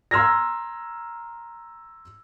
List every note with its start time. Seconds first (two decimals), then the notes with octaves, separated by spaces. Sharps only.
0.11 A#5 C6 E6 F6 G#6 A#6